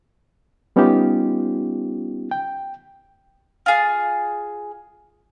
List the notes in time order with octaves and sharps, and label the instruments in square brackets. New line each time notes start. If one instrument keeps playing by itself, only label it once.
[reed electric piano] G3 B3 C#4 D#4 F4 G4
G5
[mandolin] F4 G#4